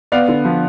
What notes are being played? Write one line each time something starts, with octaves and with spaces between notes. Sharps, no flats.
B3 D5 F5
D3
F3